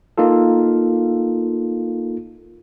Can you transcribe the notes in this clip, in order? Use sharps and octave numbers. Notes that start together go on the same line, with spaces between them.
A#3 D#4 F4 A4